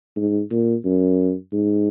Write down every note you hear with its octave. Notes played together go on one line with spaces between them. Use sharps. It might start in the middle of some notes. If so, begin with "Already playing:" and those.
G#2
A#2
F#2
G#2